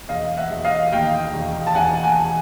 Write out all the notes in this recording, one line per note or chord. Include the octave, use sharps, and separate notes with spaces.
E1 D#5 F5
E5 F#5
E1
D#5 F5
D#2 F5 G5
E1
A5
E1 F#5 G#5
F#5 G#5